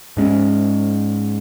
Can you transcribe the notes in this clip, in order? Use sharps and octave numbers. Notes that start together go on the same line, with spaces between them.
G#2 G#3 C#4